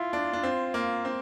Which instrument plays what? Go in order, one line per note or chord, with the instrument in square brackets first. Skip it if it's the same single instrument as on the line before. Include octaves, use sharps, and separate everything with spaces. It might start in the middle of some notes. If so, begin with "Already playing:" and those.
Already playing: [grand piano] E4 [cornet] F4
[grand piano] D4
D4
C4
A#3
C4